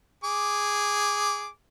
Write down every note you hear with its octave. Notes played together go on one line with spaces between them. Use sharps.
G#4 D6